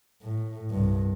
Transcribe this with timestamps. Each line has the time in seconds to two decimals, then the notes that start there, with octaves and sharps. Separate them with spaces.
0.22 A2
0.70 C2 G2